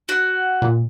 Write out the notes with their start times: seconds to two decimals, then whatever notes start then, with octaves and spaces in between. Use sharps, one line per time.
0.09 F#4
0.62 A#2